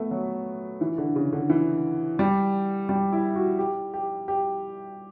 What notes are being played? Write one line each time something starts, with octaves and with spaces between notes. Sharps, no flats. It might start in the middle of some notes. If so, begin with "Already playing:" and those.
Already playing: A3 B3
F#3
E3
D3
C#3
D3
E3
G3
G3
E4
F#4
G4
G4
G4